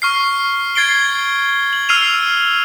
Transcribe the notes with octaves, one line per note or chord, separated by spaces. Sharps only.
C#6 F6 C7
G#6 A6 C7 D7 G7
F#7
E6 F6 C7 D#7 F7